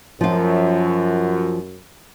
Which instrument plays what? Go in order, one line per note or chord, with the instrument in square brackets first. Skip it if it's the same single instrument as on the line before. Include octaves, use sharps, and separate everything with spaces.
[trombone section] F#2 [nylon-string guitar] F3 F4